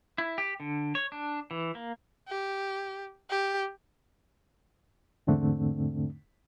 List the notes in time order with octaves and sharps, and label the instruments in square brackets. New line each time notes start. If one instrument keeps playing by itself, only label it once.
[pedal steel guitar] E4
G4
D3
C#5
D4
E3
A#3
[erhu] G4
G4
[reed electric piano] E2 G#2 D3 A3 C4 D4